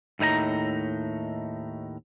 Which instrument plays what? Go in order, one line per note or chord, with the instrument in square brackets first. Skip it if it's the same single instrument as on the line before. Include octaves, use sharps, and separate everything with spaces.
[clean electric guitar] D#2 A2 D#4 G#5 A#5